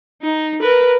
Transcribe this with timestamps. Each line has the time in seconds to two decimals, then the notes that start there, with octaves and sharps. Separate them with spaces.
0.22 D#4
0.61 A#4 B4